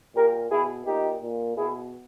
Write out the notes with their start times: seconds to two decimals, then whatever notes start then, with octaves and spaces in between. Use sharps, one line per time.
0.15 A#2 G4 A#4
0.50 B2 E4 G#4
0.86 A#2 D#4 G4
1.21 A#2
1.56 B2 E4 G#4